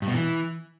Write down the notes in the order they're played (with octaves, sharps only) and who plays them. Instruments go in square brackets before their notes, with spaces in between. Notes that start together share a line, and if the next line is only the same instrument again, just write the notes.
[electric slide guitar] G2
B2
E3